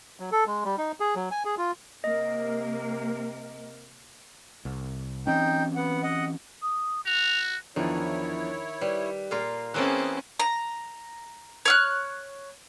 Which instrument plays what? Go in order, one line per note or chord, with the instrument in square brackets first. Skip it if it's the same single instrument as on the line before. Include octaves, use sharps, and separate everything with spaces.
[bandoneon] F#3
A4
G#3
G3
D#4
G#4
F#3
G#5
G#4
F4
[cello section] C3 A#3 A#4 [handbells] D#5
[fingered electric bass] C2
[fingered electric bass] E3 C4 C#4 [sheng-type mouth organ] D#4 G5
[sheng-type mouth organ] B3 F#5
D#5 F#5
[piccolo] D#6
[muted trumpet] F#4 [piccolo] F7
[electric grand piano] E2 F3 D4 [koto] D#3 [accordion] E4 C#5
[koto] G3 [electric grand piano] B4
[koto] A#2 A#3 F4
[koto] E3 A#3 A5 [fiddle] C4 C#4 [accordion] G#4 [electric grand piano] F#6
[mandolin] A#5
C#5 F6 F#6